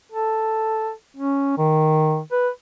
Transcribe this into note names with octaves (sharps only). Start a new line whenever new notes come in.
A4
C#4
D#3
B4